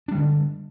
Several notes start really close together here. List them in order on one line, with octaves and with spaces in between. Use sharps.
D4 G3 D3